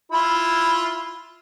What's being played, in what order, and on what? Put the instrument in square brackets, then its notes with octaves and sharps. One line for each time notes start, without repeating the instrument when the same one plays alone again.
[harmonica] E4 F4 B5